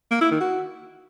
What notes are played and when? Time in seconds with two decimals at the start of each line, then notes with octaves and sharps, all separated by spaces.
0.11 A#3
0.21 E4
0.31 D#3
0.41 F#4